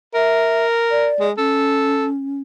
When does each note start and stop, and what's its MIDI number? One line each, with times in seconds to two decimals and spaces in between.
0.14 1.10 70
0.14 0.66 76
0.91 1.27 74
1.20 1.31 56
1.38 2.42 61
1.38 2.06 69